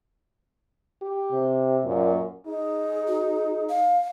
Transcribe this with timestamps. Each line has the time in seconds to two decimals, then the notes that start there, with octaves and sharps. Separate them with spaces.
1.02 G4
1.32 C3
1.85 F#2 A#2
2.46 D#4 G#4
3.08 F#4
3.69 F5